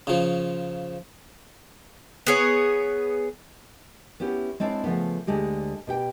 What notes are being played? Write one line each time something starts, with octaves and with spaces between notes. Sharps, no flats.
C#3 F3
B3 G#4 C#5
B3 C#4 E4 G4
G#3 C4 D4 E4 C#5 D5
C#3 F3 A3 B3
D2 D3 G#3 G4
B2 G4 G5